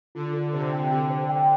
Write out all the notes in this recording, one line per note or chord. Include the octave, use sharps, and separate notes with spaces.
D3 F4
A4
C3 C5
G5
D3 G4
C5
G5